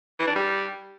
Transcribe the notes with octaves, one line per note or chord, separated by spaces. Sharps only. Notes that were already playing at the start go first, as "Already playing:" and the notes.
E3
D4
G3